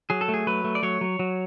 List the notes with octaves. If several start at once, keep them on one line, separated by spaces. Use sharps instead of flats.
F#3 G#4
A4
A3
G#4
F#3 B4
A3
D5
F#3 C#5
F#3
F#3